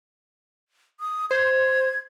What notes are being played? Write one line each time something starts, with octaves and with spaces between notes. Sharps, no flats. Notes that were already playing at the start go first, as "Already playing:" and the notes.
D#6
C5 G#6